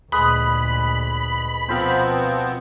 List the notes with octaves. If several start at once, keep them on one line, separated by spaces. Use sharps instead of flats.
D2 A#2 G#3 B4 B5 D#6
B2 F3 B3 C4 A#4 C5